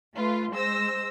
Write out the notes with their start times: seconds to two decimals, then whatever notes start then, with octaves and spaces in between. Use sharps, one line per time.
0.14 A3 F4 B4
0.52 G#3 C5 E6 A#6